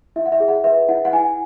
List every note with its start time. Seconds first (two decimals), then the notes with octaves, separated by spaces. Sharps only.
0.16 E4 E5
0.26 F#5
0.32 E5
0.40 G#4
0.48 F#5
0.64 B4 E5
0.89 E4 F#5
1.05 F#5
1.13 E4 G#5